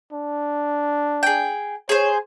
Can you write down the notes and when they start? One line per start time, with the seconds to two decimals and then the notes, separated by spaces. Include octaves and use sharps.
0.12 D4
1.23 G#4 G5
1.89 G#4 C5 C#5